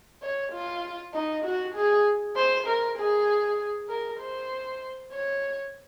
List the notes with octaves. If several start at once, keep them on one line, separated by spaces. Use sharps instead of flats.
C#5
F4
D#4
F#4
G#4
C5
A#4
G#4
A#4
C5
C#5